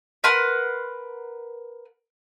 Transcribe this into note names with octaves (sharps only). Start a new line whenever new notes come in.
A#4 B4 F#5 C6